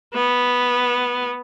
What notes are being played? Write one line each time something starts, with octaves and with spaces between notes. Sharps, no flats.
B3